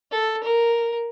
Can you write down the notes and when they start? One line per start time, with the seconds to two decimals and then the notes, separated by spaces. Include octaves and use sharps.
0.11 A4
0.43 A#4